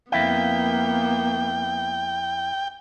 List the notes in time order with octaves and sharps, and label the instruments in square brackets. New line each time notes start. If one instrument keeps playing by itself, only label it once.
[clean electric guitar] F2 E4 F5 [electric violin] A#3 B3 [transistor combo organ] G5